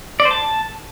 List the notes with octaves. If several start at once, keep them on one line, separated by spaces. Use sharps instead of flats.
D5
C5
A5